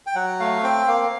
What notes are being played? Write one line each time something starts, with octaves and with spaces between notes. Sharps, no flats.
G5
F#3 F#5
A3 F5
C4 G5
A#3 F5